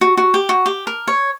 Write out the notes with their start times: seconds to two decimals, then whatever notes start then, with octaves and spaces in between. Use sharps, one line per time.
0.01 F#4
0.17 F#4
0.34 G4
0.49 F#4
0.66 G4
0.87 A#4
1.07 C#5